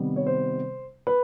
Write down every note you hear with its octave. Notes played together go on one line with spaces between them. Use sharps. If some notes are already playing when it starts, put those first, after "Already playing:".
Already playing: C3 D#3 G3 B3
C#5
C5
B4